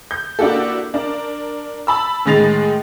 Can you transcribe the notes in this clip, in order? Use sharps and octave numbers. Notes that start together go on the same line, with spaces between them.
G6
A#3 D4 E4 F#4 G4 A4
D4 A#4
A5 B5 E6
A2 D#3 G#3 A6 F7